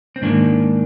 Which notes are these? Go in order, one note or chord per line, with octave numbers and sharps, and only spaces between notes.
C4
G#2 D#3 A#3 D4